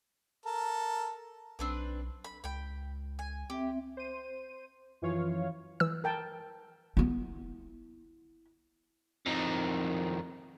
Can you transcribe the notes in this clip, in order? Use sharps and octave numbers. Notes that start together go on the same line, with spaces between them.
A4 A#4 A5
B1 C4 D4 B4
B5
C#2 G5 B5
G#5
C4 G4 E5
C5 D#7
F#2 E3 F3 F4 C#5 F5
E3 E6
A#4 G5 A5
B3 E4
F2 D#3